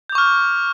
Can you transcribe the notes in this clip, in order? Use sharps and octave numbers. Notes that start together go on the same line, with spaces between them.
C#6 D6 F6 G6